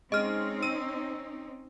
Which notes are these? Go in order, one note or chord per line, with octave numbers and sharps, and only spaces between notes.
G#3 C4 C#4 D#4 D#5 F6
E6 D#7